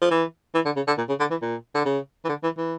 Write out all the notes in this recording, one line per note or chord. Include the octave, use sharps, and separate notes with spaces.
F3
E3
E3
D3
C#3
D3
A#2
C#3
D3
E3
A#2
D3
C#3
E3
D3
E3
E3